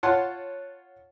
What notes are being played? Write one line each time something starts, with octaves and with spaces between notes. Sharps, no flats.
F4 C#5 F#5 A5 C6